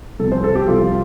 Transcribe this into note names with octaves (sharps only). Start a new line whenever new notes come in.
C2 C3 F3 A4
C5
A4
G4
C2 C3 F3 F4